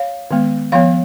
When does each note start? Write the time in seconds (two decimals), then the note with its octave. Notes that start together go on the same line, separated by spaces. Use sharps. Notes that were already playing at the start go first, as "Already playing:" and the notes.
Already playing: C#5 F5
0.31 D#3 G#3 B3
0.72 F3 B3 C#5 F5